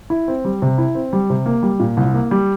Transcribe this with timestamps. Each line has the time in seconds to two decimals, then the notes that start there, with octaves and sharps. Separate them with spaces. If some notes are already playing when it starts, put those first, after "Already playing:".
0.10 E4
0.28 C4
0.45 G3
0.62 C3
0.78 E4
0.95 C4
1.13 G3
1.30 C3
1.46 A#3
1.63 G3
1.80 A#2
1.97 C2
2.14 A#3
2.31 G3